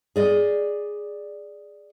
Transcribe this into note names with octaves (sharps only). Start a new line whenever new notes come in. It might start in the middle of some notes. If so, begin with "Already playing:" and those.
G#4 D5 D#5